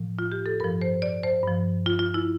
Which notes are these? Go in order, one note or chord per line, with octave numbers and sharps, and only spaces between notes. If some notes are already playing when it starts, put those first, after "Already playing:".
Already playing: A2 F3
F4
G4
A4
G2 F3 A#4
C5
D5
C5
G2 F3
F4
F4
E4